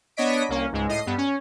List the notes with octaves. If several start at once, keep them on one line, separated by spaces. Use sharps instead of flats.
B3 D4 C#5 D#5 B6 D7
C2 A#3 C#4
C#2 G#2 G#3
A2 D#5 C7 D#7
G2 B3
C#4